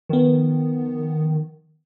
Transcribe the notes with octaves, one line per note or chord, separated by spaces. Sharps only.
D#3 F3 B3